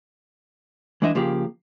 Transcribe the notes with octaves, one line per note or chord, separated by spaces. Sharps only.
E3 G#3 D4 E4 D#5 E5
C#3 F3 A#3 G4 G#4